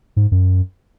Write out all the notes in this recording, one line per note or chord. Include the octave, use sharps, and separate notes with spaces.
G#2
F#2